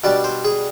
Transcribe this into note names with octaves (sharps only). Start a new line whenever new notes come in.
B2 G3 D4 D5
C5
G#4